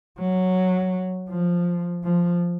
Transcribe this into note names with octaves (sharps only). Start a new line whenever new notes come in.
F#3
F3
F3